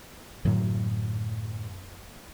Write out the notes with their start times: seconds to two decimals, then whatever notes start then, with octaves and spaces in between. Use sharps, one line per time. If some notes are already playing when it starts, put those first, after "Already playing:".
0.45 F#2 A2 D3 F#3